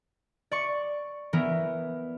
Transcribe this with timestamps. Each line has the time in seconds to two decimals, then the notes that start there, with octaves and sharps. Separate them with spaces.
0.51 D5 C#6 C#7
1.33 E3 B3 A#4